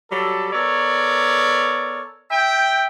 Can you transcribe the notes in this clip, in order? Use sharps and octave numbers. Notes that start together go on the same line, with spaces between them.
F#3 G3 A4
B3 A4 A#4 C#5 D5
E5 G5